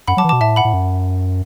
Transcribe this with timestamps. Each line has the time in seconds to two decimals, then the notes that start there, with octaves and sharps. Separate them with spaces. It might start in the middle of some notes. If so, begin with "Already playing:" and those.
0.08 F#2 F#5 B5
0.17 F#3 A5 D6
0.24 E3
0.29 B2 A5 D6
0.41 A2 E5 A5
0.56 F#5 B5
0.65 A2
0.73 F#2